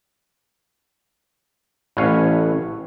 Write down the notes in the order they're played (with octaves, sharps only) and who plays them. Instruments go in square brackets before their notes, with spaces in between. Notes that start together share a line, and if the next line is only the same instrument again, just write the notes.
[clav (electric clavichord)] A1 A2 B4 C#5 F5 G#5